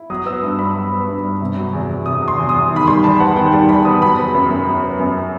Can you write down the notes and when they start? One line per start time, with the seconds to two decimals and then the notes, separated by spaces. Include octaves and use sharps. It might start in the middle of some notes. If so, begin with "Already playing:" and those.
Already playing: E4
0.10 F#3 D#6
0.26 B3 E6
0.43 G2
0.59 G2 B5
0.75 F#3
0.92 B3
1.08 G2
1.24 G2
1.41 C3
1.56 F#3
1.73 E2
1.89 E2
2.06 C3 D#6
2.22 F#3
2.28 C6
2.38 E2
2.49 D#6
2.55 E2
2.71 D#3
2.76 B5
2.87 G3 C6
3.04 E2 A5
3.20 B3 F#5
3.36 D#3 G5
3.53 G3 A5
3.69 E2 B5
3.85 B3 D#6
4.02 F#3 B5
4.18 B3
4.34 F#2
4.51 F#2
4.67 F#3
4.84 B3
5.00 F#2